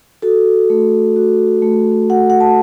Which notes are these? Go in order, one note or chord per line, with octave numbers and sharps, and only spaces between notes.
F#4 A4
A3
F#4
A3
F#4 F#5
F#5
A5